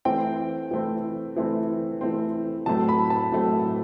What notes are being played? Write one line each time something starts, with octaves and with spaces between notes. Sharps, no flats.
E3 A3 C4 G5
E3 A3 C4
E3 A3 C4
E3 A3 C4
A2 F#3 A3 C4 A5
B5
A5
A2 F#3 A3 C4